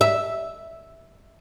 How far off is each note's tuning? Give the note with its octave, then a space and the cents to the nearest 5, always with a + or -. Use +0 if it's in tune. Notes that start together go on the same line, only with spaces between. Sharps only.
E5 -5